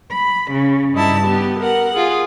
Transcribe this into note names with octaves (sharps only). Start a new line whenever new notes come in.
B5
C#3
G2 D#4 E4 A5
B3 G4
A#4 F#5
F4 G#4